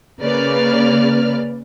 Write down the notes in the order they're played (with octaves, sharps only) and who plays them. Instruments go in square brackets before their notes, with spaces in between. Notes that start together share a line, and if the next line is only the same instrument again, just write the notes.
[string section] C#3 A#3 B4 D5 F6